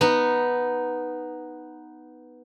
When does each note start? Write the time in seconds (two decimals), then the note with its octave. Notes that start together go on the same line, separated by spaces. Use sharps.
0.01 B3 D#4